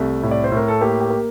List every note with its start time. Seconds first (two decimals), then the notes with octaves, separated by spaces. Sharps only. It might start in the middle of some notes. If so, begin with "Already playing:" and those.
Already playing: C2 A3
0.23 A2
0.31 D5
0.44 C5
0.52 A2 A#4
0.68 A4
0.81 A#3 G4
1.00 G4
1.10 A#3